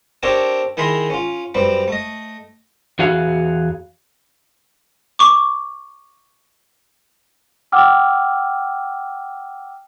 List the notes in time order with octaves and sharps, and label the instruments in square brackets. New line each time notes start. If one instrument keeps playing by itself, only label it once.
[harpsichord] C4 D4 G4 A4 A#4 C#5
D#3 E4 G#4 A#4 B5 C6
C#4 F4
F#2 G3 C4 B4
A3 D#5
[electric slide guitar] E2 F#4 G#4 F5
[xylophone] C#6 D6
[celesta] F#5 G5 D6 E6 F6